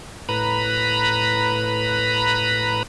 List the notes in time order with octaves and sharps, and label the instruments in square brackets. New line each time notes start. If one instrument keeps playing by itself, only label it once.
[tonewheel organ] A2 B4 A#5 B5